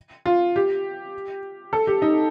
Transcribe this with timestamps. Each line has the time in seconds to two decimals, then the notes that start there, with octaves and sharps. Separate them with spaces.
0.26 F4
0.56 G4
1.73 A4
1.87 G4
2.02 D#4